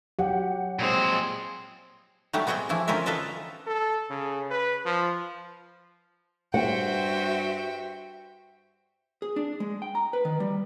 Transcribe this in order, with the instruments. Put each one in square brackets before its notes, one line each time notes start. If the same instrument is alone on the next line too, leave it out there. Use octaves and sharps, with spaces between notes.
[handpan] F#3 G4 [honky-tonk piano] F#5
[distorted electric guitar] A#2 C5 [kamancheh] G#3 C4
[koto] F#3 G3 A3 G4 A4
B3 C4 G#4 D#5 G5
E3 F3 A3 E4
D3 C4 C#4 F4 A#4 E5
F4 A4 B4 D#5 E5
[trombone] A4
C#3
B4
F3
[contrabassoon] G2 [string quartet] F#4 C5 E5 [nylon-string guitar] F#5 [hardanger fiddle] G5
[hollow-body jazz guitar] G#4
D4
G#3
G5
A#5
B4
D#3
G3